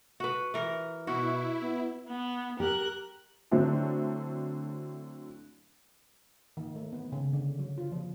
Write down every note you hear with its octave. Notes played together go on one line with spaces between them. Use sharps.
F#4 B4
E3 A#4
B2 E4 F#4
B3
B3
G4 A#4 F#6
D3 F#3 A3 C4 D4 E4
D#3
A3
B3
C#3
D3
F#3
F4
F3